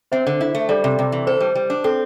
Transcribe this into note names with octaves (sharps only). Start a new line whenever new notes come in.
C4 C5 E5
D3
E4
A3
G3 A4 D5
C3
C3
E3
A4 C5
G3
G3
D4
C4 A4